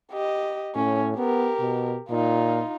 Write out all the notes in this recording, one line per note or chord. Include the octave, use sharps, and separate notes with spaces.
G4 D#5
A2 C#4
B3 G4 A#4
B2
A#2 D#4 F4